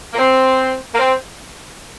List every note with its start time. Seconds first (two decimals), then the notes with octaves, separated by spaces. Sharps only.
0.13 A#3
0.18 C4
0.93 A#3
0.98 C4